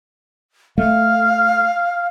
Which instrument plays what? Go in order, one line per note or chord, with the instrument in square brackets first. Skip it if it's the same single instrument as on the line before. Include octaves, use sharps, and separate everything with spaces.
[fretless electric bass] A3 [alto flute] F5